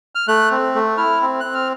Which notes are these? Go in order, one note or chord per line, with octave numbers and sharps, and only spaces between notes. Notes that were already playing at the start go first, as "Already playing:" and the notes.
F6
A3 F#6
C4
A3
E4 F6
C4
C4 F#6
F6